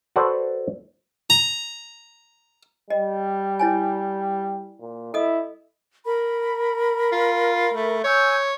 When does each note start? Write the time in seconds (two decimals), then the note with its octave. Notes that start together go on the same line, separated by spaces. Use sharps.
0.16 F#4 A4 B4 C5 D5 F#5
1.30 A#5
2.90 G3 D#5
3.59 E4 C#5 G#5
4.80 A#2
5.14 E4 A4 D#5 D#6
6.05 A#4 B5
7.12 F4
7.74 A3
8.04 C#5 G#5 E6 G6